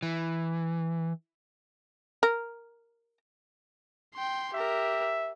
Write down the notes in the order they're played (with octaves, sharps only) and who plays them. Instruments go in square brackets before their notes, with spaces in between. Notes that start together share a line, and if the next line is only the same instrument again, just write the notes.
[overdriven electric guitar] E3
[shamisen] A#4
[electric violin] G5 C6
[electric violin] G4 A#4 [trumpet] E5